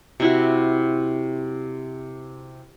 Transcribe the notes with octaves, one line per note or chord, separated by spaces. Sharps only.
C3 E4 F#4